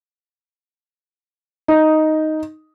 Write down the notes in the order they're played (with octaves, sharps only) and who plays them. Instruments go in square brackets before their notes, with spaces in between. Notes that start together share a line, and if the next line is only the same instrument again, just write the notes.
[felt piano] D#4